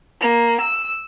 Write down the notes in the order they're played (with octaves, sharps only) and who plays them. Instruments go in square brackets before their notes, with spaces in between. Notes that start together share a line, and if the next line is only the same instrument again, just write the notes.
[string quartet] A#3
E6